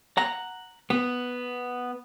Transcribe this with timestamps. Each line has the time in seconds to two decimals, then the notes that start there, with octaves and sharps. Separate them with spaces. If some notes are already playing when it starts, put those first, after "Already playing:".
0.17 F#5 A#5
0.90 B3